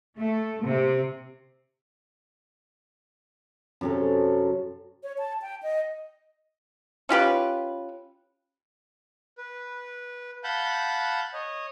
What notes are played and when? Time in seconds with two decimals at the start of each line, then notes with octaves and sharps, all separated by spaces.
0.18 A3
0.63 C3
3.81 F#2 C3 A4
5.03 C#5
5.18 A5
5.42 G5
5.63 D#5
7.09 C#4 F4 G4 B4
9.38 B4
10.44 F5 F#5 A5 B5 F#6 G6
11.33 C#5 D#5